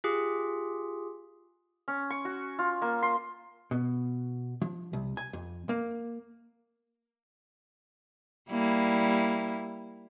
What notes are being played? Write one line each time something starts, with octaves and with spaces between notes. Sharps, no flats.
F4 G4 G#4
C#4
C#6
F#4
F4
A#3
C6
B2
F3
C2
G#5
F2
A#3
G3 A#3 E4